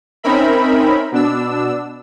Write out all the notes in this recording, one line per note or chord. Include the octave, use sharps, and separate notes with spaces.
C4 C#4 D#4 A#4 E5 B5
B2 D4 E6